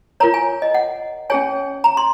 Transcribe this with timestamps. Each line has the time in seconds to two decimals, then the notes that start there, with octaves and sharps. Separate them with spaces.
0.20 F4 A#4 C#5 A#5
0.34 G#5
0.62 D#5
0.74 F#5
1.30 C#4 G#4 C#5 G#5
1.84 A#5
1.97 C6